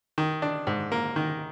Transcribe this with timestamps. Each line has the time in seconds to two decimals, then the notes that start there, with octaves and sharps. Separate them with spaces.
0.18 D#3
0.42 D4
0.67 G#2
0.92 A#3
1.16 D#3